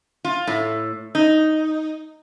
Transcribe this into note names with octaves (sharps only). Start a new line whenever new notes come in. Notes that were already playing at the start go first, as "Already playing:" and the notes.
F4
A2
D#4